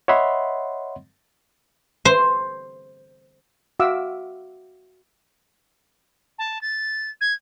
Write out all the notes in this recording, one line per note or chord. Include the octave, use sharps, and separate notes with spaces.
C#5 D#5 E5 F#5 B5 C6
C5
F#4 E5 F5 D6 E6
A5
A6
G#6